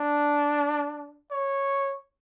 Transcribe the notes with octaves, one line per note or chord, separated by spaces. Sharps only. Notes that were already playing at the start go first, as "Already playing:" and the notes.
Already playing: D4
C#5